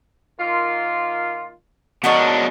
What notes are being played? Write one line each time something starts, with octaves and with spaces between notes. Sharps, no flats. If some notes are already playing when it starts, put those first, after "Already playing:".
D#3 A#3 F4
B2 G#3 D4 D#4 A#4 C#5 D#5 F#5